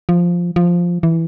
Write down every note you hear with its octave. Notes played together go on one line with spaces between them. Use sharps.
F3
F3
E3